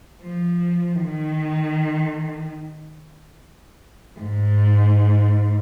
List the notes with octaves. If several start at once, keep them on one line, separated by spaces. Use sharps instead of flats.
F3
D#3
G#2